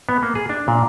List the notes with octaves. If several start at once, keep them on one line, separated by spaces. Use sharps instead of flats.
B3
A#3
G#4
D4
A#2